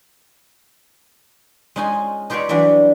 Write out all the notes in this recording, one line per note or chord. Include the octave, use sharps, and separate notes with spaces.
G#3 C#4 D#4 F4 G#5
D#4 F4 G4 B4 C#5 D5
E3 F#3 G3 D4 B4